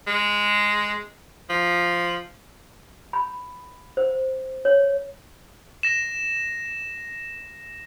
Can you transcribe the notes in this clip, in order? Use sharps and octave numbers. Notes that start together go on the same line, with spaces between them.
G#3
F3
B5
C5
C#5
A#6 E7